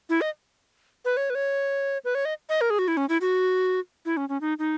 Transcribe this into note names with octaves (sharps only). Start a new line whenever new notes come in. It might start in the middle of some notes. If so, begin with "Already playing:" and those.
E4
D#5
B4
C#5
B4
C#5
B4
C#5
D#5
D#5
A#4
G#4
F#4
E4
C#4
E4
F#4
E4
C#4
C#4
D#4
D#4